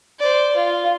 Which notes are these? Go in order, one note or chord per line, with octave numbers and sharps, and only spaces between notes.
C5 D5
F4